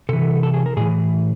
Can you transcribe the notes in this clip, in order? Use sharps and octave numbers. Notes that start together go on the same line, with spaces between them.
C3 E3 A4
A4
G#4
A#4
A2 E3 G#4